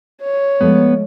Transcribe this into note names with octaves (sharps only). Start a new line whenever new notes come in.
C#5
F3 G#3 A3 B3